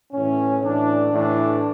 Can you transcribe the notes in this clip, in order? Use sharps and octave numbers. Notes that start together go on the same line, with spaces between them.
A2 E3 C#4
A2 E3 D4
A2 E3 D4